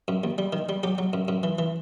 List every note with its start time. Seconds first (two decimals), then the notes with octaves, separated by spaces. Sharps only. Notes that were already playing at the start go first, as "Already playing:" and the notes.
0.08 F#2
0.24 D#2
0.38 G3
0.53 D#3
0.69 G3
0.83 F#3 G4
0.98 F#3
1.13 F#2
1.28 F#2
1.43 E3
1.59 E3